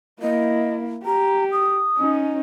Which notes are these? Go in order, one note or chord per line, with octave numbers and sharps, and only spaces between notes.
A#3 E4 D#5
G4 A#5
D#6
C#4 D#4